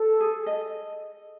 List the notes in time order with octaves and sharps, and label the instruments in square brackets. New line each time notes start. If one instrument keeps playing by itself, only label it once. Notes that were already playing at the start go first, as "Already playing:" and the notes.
Already playing: [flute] A4
[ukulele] G#4
D#5